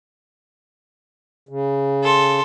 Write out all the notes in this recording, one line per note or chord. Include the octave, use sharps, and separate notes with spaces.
C#3
A4 C6